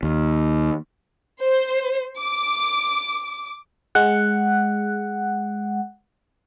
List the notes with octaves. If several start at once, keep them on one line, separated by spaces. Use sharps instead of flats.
D#2
C5
D6
G#3 F#5